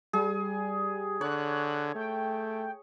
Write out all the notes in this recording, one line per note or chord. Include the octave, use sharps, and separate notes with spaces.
G3 G#4
D3 C#5 F#6
A3 G5